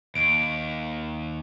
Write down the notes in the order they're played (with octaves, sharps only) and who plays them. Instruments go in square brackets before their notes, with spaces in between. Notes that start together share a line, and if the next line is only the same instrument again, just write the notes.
[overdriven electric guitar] D#2 [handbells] D7